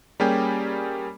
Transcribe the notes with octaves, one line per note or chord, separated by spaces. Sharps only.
G3 A#3 C#4 G4 G#4